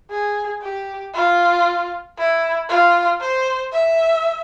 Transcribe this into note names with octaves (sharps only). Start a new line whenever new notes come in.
G#4
G4
F4
E4
F4
C5
E5